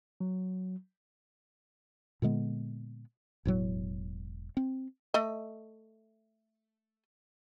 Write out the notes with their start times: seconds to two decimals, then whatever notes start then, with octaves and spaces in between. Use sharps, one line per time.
0.20 F#3
2.22 A#2 D3 G#3 B3
3.45 E1 A2 F#3
4.57 C4
5.14 A3 D#5